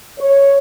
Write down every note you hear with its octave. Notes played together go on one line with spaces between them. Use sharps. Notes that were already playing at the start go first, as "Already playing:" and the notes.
C#5